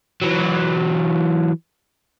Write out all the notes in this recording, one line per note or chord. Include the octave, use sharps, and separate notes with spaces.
E3 F#3